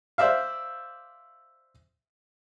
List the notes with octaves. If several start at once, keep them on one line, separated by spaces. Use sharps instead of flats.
C5 D5 E5 F5